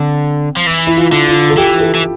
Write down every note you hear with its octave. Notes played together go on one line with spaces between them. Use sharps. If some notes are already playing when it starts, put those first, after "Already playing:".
Already playing: D3 C4
F3
E3
E4
F4
D3
F4
A4
E3 G4
A4
E3